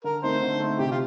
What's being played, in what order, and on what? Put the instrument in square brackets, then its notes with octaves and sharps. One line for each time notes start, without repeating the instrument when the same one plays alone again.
[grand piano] D3 [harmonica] A#4
[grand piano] A3 C4 D#4 [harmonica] C5
[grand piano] D3
A3 C4 D#4
[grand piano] C3 [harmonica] G4
[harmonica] F4